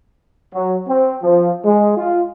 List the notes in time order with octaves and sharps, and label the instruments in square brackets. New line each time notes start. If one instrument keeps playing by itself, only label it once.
[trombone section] F#3
C4
F3
G#3
F4